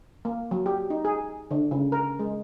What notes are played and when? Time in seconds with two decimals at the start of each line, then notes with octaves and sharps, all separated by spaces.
0.25 A#3
0.51 F#3
0.66 G4
0.90 D#4
1.05 G#4
1.51 D3
1.71 C#3
1.92 A#4
2.19 G#3